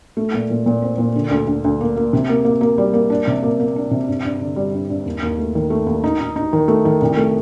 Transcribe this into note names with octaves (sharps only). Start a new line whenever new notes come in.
A3
A#2
A#2
A#2
C4
A#2
D3
D2
D2
D2
A#3
A#3
C3
A#3
A#3
A#3
G3
A#3
D4
C3
A#3
A#3
D4
C3
G2
G2
D3
G3
G2
G2
D#2
D#2
A3
D#3
A3
D#2
D#4
D#4
D#4
D#3
A3
D#3
C2
A3